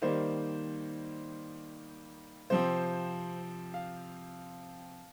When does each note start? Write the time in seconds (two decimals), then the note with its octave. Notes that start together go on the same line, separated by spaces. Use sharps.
0.02 D#3 G3 A#3 C5
2.50 C3 F3 C4 C5
3.74 F5